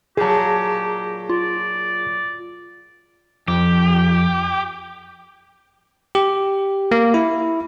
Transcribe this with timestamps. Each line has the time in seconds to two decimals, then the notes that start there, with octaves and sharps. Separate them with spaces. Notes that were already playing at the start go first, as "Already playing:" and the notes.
0.17 A#2 F#3 G4 G#4 A5
1.29 F4 D5
3.48 F2 G4
6.15 G4
6.91 A#3
7.14 E4